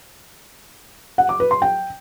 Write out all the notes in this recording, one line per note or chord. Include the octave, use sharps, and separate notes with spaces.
F#5
D6
B4
C6
G5